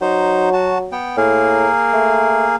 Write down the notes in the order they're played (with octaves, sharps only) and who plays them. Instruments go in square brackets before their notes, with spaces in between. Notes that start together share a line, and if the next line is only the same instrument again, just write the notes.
[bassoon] F#3 [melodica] D#4 C5
[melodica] F#4 A5
B3 G5
[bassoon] A2 [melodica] A#3 G#4 A#4
[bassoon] A3